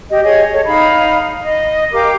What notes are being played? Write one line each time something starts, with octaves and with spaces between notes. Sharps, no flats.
G4 D#5
G#4 C#5 D#5
A4 C#5
D#4 F5 B5
D#5
G4 A#4 F5 D6